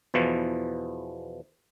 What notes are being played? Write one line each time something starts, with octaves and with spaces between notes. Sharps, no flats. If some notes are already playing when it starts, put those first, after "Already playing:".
E2 B2 E3 F3